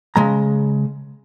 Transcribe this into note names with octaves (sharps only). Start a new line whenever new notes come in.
C#3 G#3 A#5